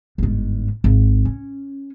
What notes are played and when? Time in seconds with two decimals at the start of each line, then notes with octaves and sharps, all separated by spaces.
0.18 G1 G#2
0.84 G#1
1.25 C#4